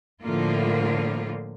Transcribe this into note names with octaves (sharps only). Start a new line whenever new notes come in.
A2 D3 F3 A#3 F4